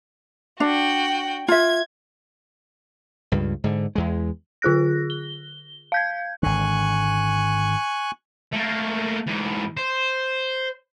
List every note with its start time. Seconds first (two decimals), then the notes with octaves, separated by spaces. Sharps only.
0.60 D4 F#4 G5
1.48 F4 E5 G#6
3.32 C#2 G2
3.64 G#2 D3
3.95 E2 G#3
4.62 D3 F4 G#4 F#6 A#6
5.10 G7
5.92 F5 G6 G#6
6.43 G#1 D3 G#5 C#6 F#6
8.53 A3 A#3
9.27 G#2 E3
9.77 C5